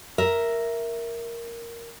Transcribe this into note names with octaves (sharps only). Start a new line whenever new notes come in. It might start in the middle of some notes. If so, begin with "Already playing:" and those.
A#4 E5